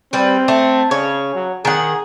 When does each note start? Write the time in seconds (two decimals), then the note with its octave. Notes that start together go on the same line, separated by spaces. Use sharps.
0.13 G3 C4 B4
0.48 A3
0.91 C#3 C#5
1.35 F#3
1.65 D#3 G#4 F#5